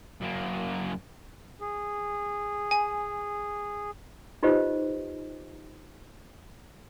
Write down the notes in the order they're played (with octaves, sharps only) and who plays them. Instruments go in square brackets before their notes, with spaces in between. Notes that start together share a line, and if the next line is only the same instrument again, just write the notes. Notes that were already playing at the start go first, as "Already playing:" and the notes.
[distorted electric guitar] F#2 A#3
[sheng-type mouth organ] G#4
[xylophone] G#5
[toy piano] D#4 F4 G4 B4 C5 D#5